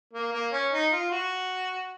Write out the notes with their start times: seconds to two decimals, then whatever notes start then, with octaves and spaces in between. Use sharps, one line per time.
0.13 A#3
0.32 A#3
0.52 C#4
0.72 D#4
0.92 F4
1.11 F#4